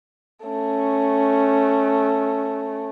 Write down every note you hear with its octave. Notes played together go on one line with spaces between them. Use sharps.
A3 C#4